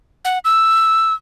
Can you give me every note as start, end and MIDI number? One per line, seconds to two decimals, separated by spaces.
0.25 0.38 78
0.45 1.13 88